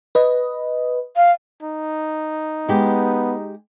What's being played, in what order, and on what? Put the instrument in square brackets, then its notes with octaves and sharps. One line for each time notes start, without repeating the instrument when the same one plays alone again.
[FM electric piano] B4 D#5
[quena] F5
[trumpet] D#4
[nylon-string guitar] G#3 G4 [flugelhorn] B3